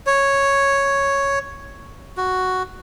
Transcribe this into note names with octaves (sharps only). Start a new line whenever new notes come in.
C#5
F#4